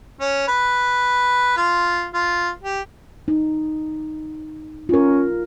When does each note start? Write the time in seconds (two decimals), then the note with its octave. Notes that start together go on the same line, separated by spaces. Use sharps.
0.21 C#4
0.48 B4
1.57 F4
2.14 F4
2.63 G4
3.28 D#4
4.89 C#4 F4 A#4